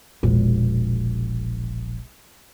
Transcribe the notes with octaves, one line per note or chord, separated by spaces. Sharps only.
E1 A#1